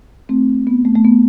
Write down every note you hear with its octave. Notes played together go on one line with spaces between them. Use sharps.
A3 C4
B3
A3
A3
B3